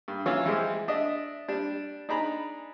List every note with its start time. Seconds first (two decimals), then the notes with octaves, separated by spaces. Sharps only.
0.08 G2
0.26 E3 F#3 C#4 F4 C#5
0.46 E3 F3 G3 G#3 F4 G4
0.88 D4 D#5 E5
1.48 G3 D4
2.09 D4 D#4 G#4 A#5 B5